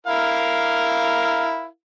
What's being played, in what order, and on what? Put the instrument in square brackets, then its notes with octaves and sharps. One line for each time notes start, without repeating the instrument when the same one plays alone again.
[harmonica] E4 A#4 F5